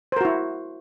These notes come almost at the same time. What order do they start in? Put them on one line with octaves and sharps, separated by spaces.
C5 A#4 F#4 E4